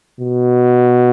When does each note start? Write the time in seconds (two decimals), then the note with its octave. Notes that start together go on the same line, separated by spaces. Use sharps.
0.20 B2